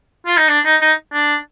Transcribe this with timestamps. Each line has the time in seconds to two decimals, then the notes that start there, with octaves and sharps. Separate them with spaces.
0.26 F4
0.37 D#4
0.48 D4
0.65 D#4
0.81 D#4
1.13 D4